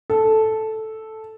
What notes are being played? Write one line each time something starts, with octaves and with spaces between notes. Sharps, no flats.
A4